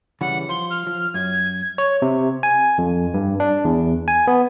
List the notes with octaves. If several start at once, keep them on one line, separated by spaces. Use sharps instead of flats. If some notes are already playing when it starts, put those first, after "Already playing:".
C#3 E3 G3 F#5
F3 C6
F6
F3
F#2 G#6
C#5
C3
G#5
F2
G2
D4
E2
G#5
B3